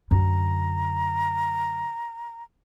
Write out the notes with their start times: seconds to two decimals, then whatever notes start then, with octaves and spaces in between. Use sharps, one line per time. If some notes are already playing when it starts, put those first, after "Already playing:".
0.11 F#2 D3 A#5